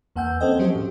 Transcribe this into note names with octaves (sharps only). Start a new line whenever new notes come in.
E2 A#3 F#5 G#5 E6 G6
C4 C#4 A4 C5 D#5 G5
F3 F#3 F#4 G4 C5 D#5
A2